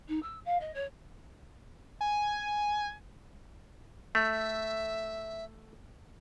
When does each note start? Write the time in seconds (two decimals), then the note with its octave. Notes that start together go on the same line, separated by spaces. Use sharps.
0.08 D#4
0.22 E6
0.45 F5
0.60 D#5
0.74 C#5
2.01 G#5
4.15 A3 E5